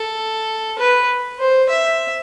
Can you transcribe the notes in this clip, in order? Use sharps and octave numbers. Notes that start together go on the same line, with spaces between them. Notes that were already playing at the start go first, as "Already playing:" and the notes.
Already playing: A4
B4
C5
E5